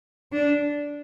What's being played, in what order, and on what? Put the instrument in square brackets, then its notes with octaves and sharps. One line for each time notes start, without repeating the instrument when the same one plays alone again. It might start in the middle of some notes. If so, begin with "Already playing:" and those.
[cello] D4